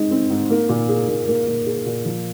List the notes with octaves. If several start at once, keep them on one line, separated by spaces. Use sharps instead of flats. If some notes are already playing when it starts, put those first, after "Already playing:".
Already playing: G#2 G#3 C4 D#4
C4
G#2
A#3
A#2
G#4
A#2
A#3
A#2
G#4
A#2
F3